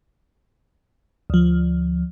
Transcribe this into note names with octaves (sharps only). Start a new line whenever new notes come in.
D2 F3